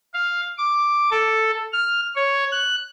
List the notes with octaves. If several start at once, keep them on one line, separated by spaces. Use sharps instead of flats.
F5
D6
A4
F6
C#5
F#6